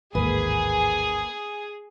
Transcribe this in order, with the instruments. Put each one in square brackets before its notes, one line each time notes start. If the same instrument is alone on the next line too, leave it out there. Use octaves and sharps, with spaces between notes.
[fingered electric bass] A1 D#2 G#2 [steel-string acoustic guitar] A#3 B4 [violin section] G#4 [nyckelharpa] G#5 D#6